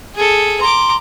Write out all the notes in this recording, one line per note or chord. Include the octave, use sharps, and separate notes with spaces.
G#4 A4
A#5 C6 D6